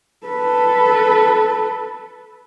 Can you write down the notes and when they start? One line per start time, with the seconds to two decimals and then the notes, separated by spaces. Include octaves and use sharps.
0.26 A4 B4